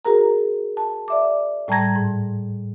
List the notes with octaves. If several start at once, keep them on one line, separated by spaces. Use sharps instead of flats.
F#4 G#4 A#4 A#5
A5
D5 E5 D6
A2 G3 A5 A#5 G#6 A#6
G#2